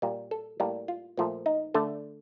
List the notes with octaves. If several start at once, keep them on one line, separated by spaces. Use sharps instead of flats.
A#2 G3 A#3
A4
A2 G3 A#3
F4
A#2 F3 A3
D#4
D3 A3 D4